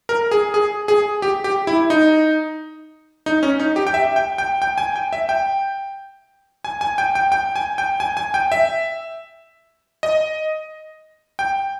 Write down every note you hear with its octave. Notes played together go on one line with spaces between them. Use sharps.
A#4
G#4
G#4
G#4
G4
G4
E4
D#4
D#4
C#4
D#4
G4
G5
E5
G5
G5
G5
G#5
G5
E5
G5
G#5
G#5
G5
G5
G5
G#5
G5
G#5
G#5
G5
E5
D#5
G5